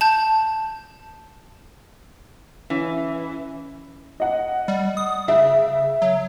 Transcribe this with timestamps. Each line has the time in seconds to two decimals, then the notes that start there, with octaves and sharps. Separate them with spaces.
0.01 A5 G6
2.70 E3 C#4
4.20 D#5 F#5
4.68 G3
4.97 D#6
5.28 C#3 E5
6.02 F#3